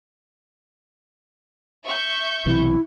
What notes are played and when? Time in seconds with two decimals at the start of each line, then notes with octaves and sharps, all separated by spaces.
1.85 E5 C#6 G6
2.46 B1 C3 E3 E4